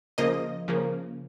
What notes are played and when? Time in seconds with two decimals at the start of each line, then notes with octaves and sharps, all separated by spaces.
0.18 C#3 F3 A#3 D#5
0.68 C#3 F3 A#3